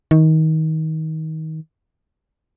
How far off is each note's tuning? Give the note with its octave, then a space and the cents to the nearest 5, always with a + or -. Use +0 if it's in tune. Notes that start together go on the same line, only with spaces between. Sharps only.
D#3 +25